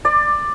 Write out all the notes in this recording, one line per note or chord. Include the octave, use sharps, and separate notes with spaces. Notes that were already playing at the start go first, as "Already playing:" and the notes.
D5